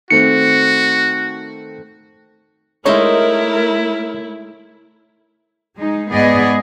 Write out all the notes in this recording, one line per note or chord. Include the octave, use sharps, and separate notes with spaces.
D#3 A3 C4 F#4 C#7
G#3 A3 D#4 E4 A#4 C5 C#5 E5
G#3 D#4
G#2 B3 G#4 D5 D#5